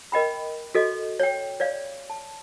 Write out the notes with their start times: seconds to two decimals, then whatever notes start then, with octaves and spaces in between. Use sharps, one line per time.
0.12 A#4 D#5 G5 B5
0.75 F#4 A4 D#5
1.20 C#5 G5
1.60 C#5 D5 F5
2.10 A5